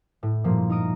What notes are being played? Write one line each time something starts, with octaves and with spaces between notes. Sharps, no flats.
A2
G2 A#2 F3 A#3
D#4 A#4 D#6 D7